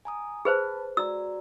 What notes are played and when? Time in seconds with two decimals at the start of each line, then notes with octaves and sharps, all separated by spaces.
0.05 G#5 A#5 D#6
0.45 G#4 B4 C5 A5 B5
0.97 F#4 D5 A#5 E6